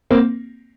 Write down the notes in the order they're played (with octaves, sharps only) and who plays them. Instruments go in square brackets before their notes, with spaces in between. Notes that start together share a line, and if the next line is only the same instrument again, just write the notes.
[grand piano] A#3 C4